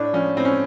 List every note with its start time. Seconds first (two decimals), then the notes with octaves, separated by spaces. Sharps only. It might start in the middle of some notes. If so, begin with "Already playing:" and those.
Already playing: A2 D4
0.13 F3 C#4
0.37 A2 C4
0.45 C#4